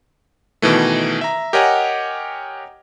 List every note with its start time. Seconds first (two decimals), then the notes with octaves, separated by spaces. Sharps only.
0.62 B2 D#3 E3 A3
1.21 E5 A#5
1.53 G4 A#4 C#5 D#5 F#5 G#5